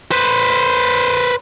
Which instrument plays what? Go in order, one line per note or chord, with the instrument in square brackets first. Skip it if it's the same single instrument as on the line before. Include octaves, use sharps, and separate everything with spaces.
[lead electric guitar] B4 C5